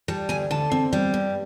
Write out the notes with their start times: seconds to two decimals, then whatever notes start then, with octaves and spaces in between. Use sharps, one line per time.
0.08 G3 A5
0.29 D2 G#5
0.51 D3 A5
0.72 C4
0.93 G3
1.14 G2